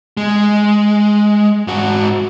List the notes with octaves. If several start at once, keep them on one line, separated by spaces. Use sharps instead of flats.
G#3
G#2 F#4